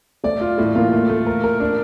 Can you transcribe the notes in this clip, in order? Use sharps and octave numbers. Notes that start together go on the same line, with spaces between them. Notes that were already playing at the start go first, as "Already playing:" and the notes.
A3 D5
F4
A2 A3
A#3 F4
A3
A3
A#4
A#4
D4